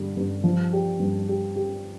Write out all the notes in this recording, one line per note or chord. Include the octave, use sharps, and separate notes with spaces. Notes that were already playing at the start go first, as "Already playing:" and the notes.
Already playing: G2 D3 G3
G2
F3
G4
G2
G4
G4